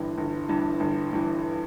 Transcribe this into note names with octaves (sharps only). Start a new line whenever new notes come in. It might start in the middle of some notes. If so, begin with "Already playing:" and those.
Already playing: G1 G2 E3
G1
G2 E3
G1
G2 E3